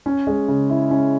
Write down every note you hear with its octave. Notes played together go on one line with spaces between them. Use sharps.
C#4
G#3
C#3
E4
C#4